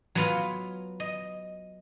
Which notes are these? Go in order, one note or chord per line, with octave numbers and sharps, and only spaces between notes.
F#3 B3 F4
D#5